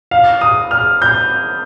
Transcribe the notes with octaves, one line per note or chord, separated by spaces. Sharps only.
F5
D#6
F6
G6